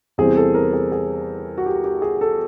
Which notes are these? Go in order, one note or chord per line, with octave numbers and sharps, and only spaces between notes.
E2 C3 E3 G3 C4 G#4
A4
A#4
G#4
G#4
F#4
G4
G4
G#4
A4